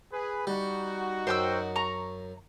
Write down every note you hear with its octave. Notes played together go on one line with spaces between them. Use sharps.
G#4 B4
G3 D#4 F#4
F#2 C5 G5 E6
A#5 C#6